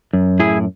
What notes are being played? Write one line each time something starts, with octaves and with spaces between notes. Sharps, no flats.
F#2
A2 E4 G#4